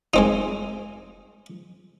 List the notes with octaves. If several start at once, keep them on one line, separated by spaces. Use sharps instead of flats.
G#3 C4 D#4